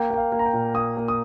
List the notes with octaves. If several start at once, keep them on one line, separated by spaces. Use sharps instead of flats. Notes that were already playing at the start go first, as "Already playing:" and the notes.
Already playing: A#3 G5
A#3 G5
F5
A#3
A#5
G5
A#2
A#3 D#6
A#3
D#6